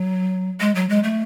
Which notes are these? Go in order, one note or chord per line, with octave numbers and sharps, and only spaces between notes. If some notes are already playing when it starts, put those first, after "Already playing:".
Already playing: F#3
G#3
F#3
G#3
A3